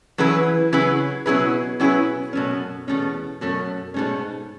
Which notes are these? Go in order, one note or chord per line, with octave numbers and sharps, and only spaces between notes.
E3 F#3 C#4 E4 G#4 B4
C#3 F#3 C#4 E4 G#4 B4
B2 F#3 C#4 E4 G#4 B4
F#3 C#4 E4 G#4 B4
F#2 B2 A3 C#4
E2 B2 A3 C#4
F#2 B2 A3 C#4
G#2 B2 A3 C#4